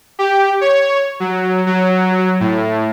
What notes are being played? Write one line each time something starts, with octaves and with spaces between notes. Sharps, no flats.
G4
C#5
F#3
F#3
A2